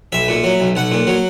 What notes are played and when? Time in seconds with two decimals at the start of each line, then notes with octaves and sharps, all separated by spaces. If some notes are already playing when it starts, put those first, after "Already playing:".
0.12 B1 E5
0.28 A#2
0.44 F#3
0.60 B1
0.75 B1 F#5
0.92 A#2
1.07 F#3